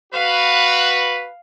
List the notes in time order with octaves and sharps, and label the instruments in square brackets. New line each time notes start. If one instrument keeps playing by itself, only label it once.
[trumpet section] F#4 B4 [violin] F5